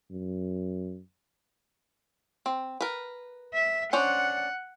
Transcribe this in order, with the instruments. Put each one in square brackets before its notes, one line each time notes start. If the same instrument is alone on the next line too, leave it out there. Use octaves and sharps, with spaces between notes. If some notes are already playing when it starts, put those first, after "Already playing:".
[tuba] F#2
[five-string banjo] C4
A#4 B4
[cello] E5
[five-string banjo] C#4 D4 C5 [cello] F#5